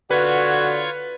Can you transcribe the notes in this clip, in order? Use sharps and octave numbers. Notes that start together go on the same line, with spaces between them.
D3 F4 F#4 B4 C#5 G#6